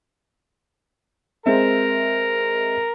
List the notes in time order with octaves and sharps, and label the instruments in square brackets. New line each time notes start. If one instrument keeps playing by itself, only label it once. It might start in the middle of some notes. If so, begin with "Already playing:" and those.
[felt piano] G#3 C4 E5 [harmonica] A#4